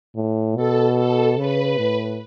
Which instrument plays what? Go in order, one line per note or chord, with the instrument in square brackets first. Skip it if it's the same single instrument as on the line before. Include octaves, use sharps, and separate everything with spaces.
[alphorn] A2
[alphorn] B2 [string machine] A4
[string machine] A4
[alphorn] C#3 [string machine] B4
[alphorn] A2